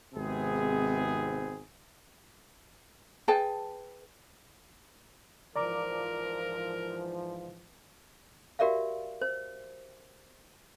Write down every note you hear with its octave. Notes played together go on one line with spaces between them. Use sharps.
G#1 G#2 C3 B3 C4 G#4
G#4 B4 G5 A5
G#2 E3 F3 A#4 D5 A#5 D6
F#4 G4 A#4 D5 E5 F5
C5